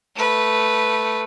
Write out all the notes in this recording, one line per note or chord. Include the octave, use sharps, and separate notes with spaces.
A3 B4